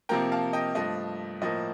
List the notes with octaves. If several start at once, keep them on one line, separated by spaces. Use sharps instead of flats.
C3 F3 A#3 G5 A#5
F5 A5
D#5 G5
G2 F3 A3 D#5
A2 F3 A#3 D#5